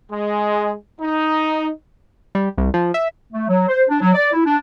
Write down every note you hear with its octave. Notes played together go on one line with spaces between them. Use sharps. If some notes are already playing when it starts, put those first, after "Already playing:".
G#3
D#4
G3
C2
F3
E5
A3
F#3
C5
D4
F#3
D5
E4
D4